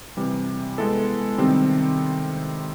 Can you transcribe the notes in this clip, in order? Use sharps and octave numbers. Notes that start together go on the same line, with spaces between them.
C3 E3 G3
G#3 B3 E4 A4
C3 D#3 G3 C4